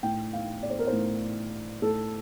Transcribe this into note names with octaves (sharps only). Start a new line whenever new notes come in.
A2 G5
F5
D5
C5
A#4
C5
A2
A2 A4